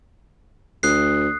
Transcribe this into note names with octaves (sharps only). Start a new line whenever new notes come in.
D2 D#6 F#6 C7